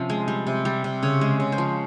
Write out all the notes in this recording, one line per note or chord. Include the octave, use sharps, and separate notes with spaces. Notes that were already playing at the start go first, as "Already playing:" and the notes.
Already playing: C3 F3 C#4
G#3
G3
C3
G3
C3
C#3 C#5
G#3
C#3
C5
F3